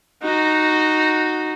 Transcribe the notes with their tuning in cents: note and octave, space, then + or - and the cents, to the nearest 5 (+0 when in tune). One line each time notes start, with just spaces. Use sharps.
D#4 -5 F#4 +0